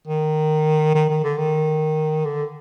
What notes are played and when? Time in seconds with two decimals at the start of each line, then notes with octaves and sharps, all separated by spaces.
0.07 D#3
0.95 D#3
1.10 D#3
1.23 D3
1.38 D#3
2.25 D3